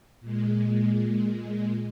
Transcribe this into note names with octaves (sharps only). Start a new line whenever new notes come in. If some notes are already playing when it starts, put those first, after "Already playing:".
A#2 G#3